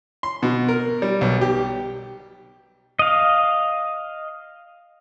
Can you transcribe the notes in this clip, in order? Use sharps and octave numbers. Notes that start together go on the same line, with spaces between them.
C6
B2
A#4
G3
B1
G4
D#5 F5